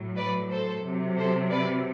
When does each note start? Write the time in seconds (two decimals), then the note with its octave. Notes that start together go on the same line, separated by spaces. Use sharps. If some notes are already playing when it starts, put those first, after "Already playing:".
Already playing: A2 F#3
0.17 B4 D5
0.50 A4 C5
0.84 C3 F#3
1.17 A4 C5
1.50 B4 D5